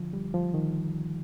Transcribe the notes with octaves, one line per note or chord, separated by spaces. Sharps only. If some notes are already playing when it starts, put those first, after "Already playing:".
Already playing: D3 F3
G3
F3
D#3